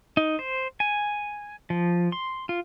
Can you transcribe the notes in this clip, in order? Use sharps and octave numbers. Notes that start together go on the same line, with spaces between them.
D#4
C5
G#5
F3
C6
F4